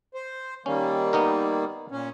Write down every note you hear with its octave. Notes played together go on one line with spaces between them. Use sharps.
C5
D#3 G3 A#3 C#4
B3 D#4 A#4
A#2 C#4